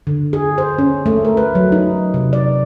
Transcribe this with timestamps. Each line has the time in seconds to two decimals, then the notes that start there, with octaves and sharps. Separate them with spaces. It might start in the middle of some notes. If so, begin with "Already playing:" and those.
0.07 D3
0.33 G#4
0.58 C5
0.78 C#4
1.06 A3
1.25 A#4
1.37 B4
1.55 F#3
1.72 D#4
2.14 C3
2.33 D5